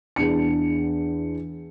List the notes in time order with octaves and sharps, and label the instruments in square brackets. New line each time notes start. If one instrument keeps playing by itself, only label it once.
[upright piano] E2 D4 C#7